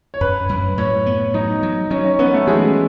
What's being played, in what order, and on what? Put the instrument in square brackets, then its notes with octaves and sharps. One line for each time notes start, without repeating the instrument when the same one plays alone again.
[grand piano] C#5
[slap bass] F#2 [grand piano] B4
[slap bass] F#2
[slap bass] A2 [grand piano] C#5
[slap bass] B3
[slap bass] F#3 [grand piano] D#4
[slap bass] F#3
[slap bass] F#3 [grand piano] C#4
[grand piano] C#4
[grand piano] B3 [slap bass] C#4
[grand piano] A3
[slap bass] E3 [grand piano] G#3